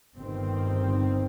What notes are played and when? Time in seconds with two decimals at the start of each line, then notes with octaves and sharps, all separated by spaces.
0.16 G1 G2 D#3 C4